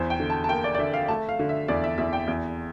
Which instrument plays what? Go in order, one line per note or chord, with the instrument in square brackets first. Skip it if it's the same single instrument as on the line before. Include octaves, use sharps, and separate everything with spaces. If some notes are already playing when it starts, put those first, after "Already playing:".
Already playing: [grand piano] E2 C5
G5
D3
A5
A5
A#3 G5
D5
D5
D3 E5
F5
A3 A5
F5
D3
E5
E2 D5
E5
E2 E5
G5
E2